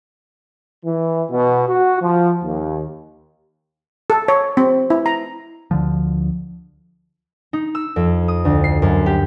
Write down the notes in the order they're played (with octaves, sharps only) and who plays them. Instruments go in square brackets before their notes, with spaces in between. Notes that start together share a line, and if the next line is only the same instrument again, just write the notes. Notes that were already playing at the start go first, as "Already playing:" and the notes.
[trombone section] E3
B2
F#4
F3
D#2
[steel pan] A4
C#5
C4
E4
A#5
[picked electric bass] D2 D3 F3
[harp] D#4
E6
F2
D#6
D2
C7
F#2
G4